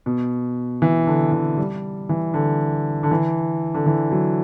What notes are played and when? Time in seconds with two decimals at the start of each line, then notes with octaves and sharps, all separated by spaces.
0.06 B2
0.82 E3
1.07 D3
1.32 E3
1.57 G3
2.09 E3
2.34 D3
3.03 D3
3.11 E3
3.74 D3
3.86 E3
4.12 F#3